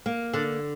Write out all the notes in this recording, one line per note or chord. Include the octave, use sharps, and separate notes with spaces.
A#3
D3 D4